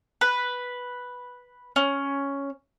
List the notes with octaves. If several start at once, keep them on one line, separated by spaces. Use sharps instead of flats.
B4
C#4